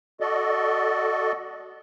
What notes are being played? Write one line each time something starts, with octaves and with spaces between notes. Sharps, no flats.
F#4 A4 D5 D#5